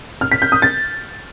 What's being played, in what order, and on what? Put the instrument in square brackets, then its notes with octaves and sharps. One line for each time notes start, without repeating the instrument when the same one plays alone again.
[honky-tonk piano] F6
B6
G6
D#6
A6